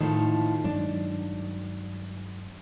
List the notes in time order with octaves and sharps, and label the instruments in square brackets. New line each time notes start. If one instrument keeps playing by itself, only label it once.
[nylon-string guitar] A2 F3 [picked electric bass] D#3
[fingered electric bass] G2 F#3 G#3 [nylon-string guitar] D4